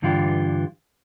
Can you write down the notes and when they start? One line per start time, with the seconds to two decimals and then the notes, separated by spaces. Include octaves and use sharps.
0.02 G2 D3 E3 F4 G4